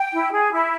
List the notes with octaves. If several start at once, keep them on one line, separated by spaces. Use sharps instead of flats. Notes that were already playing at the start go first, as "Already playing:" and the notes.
Already playing: G5
E4
G#4
E4